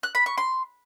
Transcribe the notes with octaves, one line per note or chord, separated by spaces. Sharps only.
F#6
B5
C#6
C6